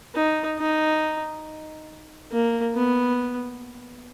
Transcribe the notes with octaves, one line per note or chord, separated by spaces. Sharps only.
D#4
D#4
A#3
B3